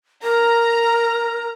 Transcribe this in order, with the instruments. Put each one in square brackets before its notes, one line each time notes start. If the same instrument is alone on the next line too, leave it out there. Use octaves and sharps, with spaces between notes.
[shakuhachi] A#4 [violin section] A#5